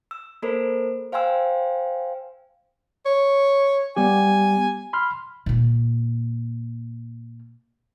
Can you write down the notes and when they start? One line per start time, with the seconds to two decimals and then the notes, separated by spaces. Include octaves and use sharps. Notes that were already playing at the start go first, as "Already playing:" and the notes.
0.11 E6
0.42 A#3 A4 A#4 C5
1.12 C5 F5 G5 G#5 C6 E6
3.05 C#5
3.97 G3 B3 G4 G#5
4.93 B5 C6 F6
5.46 A#2 A#3